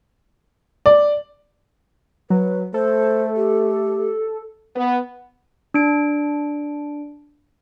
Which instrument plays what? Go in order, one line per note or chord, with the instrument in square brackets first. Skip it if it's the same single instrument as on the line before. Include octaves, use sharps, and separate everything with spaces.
[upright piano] D5
[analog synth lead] F#3 [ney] B4
[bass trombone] A3 [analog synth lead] A4 [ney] C5
[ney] G4
[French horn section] B3
[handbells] D4 D7